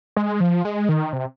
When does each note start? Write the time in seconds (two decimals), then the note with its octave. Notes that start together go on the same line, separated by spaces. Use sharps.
0.16 G#3
0.40 F3
0.65 G#3
0.89 D#3
1.13 C3